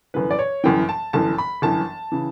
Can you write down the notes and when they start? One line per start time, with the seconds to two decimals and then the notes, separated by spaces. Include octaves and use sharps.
0.14 G1 F#2 E3 B4
0.31 D5
0.39 C#5
0.64 G1 F#2 E3 G5
0.89 A5
1.13 G1 F#2 E3 A5
1.38 B5
1.62 G1 F#2 E3 A5
2.12 C#3 E3